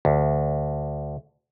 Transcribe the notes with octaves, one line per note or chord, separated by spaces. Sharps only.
D2